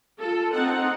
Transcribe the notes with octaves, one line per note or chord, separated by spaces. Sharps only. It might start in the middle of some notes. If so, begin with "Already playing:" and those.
F4 A4
C4 D#4 F#5